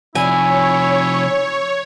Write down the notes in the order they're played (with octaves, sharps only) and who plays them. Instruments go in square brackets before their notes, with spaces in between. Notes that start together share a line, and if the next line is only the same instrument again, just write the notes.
[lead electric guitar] C3 F3 [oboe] E4 [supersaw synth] C#5 [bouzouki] G#5